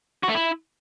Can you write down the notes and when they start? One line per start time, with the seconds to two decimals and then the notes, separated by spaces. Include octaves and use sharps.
0.23 F#4
0.29 A3
0.35 E4